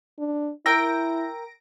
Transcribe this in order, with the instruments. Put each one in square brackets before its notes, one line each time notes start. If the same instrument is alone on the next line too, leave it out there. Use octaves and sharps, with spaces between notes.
[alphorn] D4
[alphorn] E4 [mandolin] A#4 G5 E6 [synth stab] A#6 D7